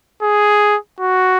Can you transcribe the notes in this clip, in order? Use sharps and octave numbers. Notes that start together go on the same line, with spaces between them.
G#4
F#4